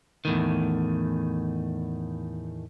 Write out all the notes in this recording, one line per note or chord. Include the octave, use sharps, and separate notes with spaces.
E2 A2 D#3